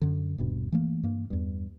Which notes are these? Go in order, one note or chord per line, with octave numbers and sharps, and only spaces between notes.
F#2 D3
D#1 G2 B2
E3 A3 A#3
G2 A#3
E2 G2